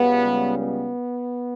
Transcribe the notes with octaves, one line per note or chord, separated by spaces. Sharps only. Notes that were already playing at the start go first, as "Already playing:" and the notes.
Already playing: C#2 C#3 G3 B3
B3